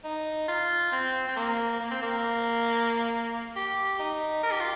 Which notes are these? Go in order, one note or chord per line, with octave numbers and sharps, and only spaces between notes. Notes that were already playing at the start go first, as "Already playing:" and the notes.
D#4
F4
C4
C4
A#3
A#3
C4
A#3
G4
D#4
A#4
G4
F4